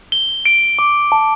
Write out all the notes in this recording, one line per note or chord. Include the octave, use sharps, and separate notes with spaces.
G7
D7
D6
A5